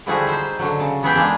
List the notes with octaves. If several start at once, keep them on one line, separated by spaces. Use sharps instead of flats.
D3 F3 G3 E4 F#4 G#4
D#4 C5 E5
D3 F#3
C#3 A5
E3 B3 E4 G#4 E5 G5
G#3 A#3 D4 G#4